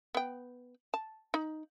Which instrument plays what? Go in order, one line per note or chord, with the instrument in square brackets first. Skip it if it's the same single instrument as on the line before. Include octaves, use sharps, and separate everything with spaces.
[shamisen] B3 G5
A5
D#4